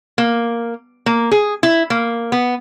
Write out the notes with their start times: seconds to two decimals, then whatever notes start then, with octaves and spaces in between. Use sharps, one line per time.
0.18 A#3
1.06 A#3
1.31 G#4
1.63 E4
1.90 A#3
2.32 B3